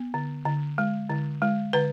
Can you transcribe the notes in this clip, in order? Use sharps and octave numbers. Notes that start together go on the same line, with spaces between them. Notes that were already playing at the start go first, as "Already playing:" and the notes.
Already playing: B3
D3
D3
G#3
D3
G#3
D3 B4